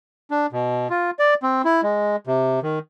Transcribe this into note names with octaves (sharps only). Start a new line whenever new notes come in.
D4
B2
F4
D5
C4
E4
G#3
C3
D#3